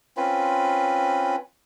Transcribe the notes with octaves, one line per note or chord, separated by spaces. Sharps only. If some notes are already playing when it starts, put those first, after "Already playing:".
C4 C#4 F4 B4